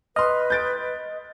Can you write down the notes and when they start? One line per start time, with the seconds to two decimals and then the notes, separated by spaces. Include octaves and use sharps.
0.16 B4 D#5 C6 F6
0.50 G6 A6 D7